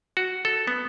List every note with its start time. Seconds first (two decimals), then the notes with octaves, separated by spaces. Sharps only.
0.17 F#4
0.45 A4
0.67 B3